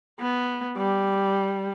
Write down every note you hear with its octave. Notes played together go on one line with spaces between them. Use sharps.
B3
G3